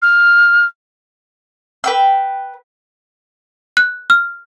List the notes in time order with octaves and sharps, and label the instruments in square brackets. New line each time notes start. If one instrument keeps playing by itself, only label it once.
[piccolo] F6
[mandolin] B4 G5 E6
[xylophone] F#6
F6